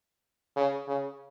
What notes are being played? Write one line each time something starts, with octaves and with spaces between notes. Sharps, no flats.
C#3
C#3